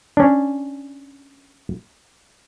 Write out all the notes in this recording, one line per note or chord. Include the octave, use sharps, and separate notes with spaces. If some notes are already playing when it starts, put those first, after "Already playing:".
C#4 D4